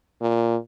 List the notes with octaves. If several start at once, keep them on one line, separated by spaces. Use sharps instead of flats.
A#2